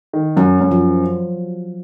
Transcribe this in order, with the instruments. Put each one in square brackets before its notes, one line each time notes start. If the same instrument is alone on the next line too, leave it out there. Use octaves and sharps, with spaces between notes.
[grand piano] D#3
[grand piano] F#2 [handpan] F#3
[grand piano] F#2
[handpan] F3